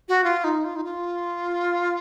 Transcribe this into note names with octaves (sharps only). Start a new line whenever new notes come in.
F#4
F4
D#4
F4
D#4
F4